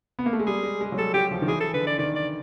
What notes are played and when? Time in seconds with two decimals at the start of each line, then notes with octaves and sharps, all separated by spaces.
0.19 B3
0.26 A#3
0.33 A3
0.40 G#3
0.47 G3 G#4
0.63 G#3
0.81 G#3
0.92 F#3
0.98 G3 A4
1.14 F#3 G4
1.31 F3
1.42 D#3
1.48 E3 G#4
1.60 A4
1.73 D3 B4
1.87 D5
1.98 D#3 D5
2.15 D5